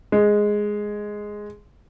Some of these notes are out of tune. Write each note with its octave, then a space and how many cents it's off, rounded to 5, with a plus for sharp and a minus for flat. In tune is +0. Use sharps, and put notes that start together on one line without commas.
G#3 +0